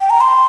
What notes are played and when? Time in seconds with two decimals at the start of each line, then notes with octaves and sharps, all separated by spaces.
0.01 G5
0.10 A#5
0.21 C6